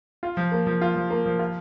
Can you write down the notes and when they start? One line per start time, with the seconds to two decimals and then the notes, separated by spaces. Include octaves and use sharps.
0.23 F4
0.37 F3
0.52 A#3
0.66 F3
0.81 F4
0.95 F3
1.10 A#3
1.25 F3
1.39 F4